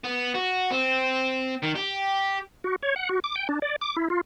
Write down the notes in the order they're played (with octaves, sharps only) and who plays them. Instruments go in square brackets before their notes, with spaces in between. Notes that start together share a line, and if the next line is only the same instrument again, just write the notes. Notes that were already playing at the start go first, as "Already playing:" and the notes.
[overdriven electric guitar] B3
F#4
C4
D#3
G4
[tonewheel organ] F#4
C#5
F#5
F#4
D6
G5
D4
D5
D6
E4
F4